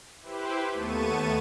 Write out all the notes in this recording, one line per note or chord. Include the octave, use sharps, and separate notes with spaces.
E4 G4 B4 C5
D#2 A3 B3 A5 C#6 D#7